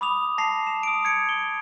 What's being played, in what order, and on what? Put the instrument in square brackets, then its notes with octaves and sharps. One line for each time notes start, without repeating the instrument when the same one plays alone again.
[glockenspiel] B5 D6 D#6 F7
A5 A#6 C7 F7
E7
D#6 D7
G#6 C#7 D7
G7